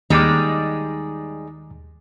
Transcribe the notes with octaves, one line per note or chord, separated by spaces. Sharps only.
D#2 G3 G#3 D#4 D6